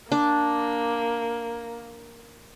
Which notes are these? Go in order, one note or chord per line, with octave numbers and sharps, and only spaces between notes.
A#3 D4